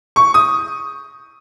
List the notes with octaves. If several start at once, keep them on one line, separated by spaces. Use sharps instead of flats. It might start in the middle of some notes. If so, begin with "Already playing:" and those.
C#6
D#6